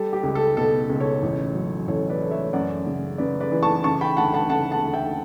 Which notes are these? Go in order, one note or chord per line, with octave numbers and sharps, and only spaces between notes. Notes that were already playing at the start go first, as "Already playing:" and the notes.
Already playing: G3 A4
G4
C#2
A4
B2 A4
C#2
A4 C#5
A1
F#3
A1 A4 C#5
B4 D5
A3
C#5 E5
F#2 D5 F#5
C#3
C#3 B4 D5
B4 D5
E3
A5 C#6
C#3 A5 C#6
G5 B5
D2 F#5 A5
F#5 A5
C#3 F#5 A5
F#5 A5
D2
E5 G5